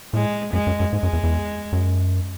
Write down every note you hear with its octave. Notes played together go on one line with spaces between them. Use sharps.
A2 G#3
F#2 G#3
F#2
F#2
G#2 G#3
F#2
E2
E2
F#2